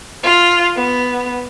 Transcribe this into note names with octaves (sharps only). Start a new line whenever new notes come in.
F4
B3